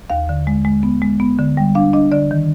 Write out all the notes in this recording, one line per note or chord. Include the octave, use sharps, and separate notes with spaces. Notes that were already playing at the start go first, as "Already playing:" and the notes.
D#2 F5
D3
G#3
G#3
B3
G#3
B3
D3
G3
D4 F5
D4 D#5
D3 D5
D#3